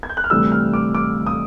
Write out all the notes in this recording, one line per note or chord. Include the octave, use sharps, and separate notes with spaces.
G#6
G6
F#6
F6
D2 C3 E3 G3 E6
F6
D6
D6
D#6